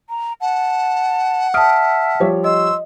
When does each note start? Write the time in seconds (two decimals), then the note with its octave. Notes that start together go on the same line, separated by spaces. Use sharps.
0.09 A#5
0.41 F#5 A5
1.54 E5 A5 D#6 F6 D7
2.20 F3 G3 C#5
2.44 D#5 C6 E6